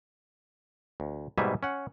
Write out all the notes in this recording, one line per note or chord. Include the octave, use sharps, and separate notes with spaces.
D2
G#2 B2 G3 A#3 E5 G#5
C#4 F#5